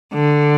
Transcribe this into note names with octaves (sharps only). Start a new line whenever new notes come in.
D3